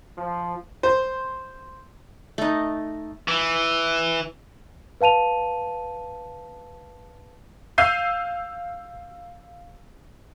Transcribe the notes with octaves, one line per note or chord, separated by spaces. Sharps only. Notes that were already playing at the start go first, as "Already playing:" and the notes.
F3
C5
A3 D#4
E3
B4 F5 A5 D#7 F7
F5 E6 G6 C7 D#7